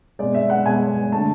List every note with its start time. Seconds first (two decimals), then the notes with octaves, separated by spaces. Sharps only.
0.19 B2 G#3 D5
0.35 E5
0.50 F#5
0.66 B2 G#3 G#5
1.12 D3 A3 A5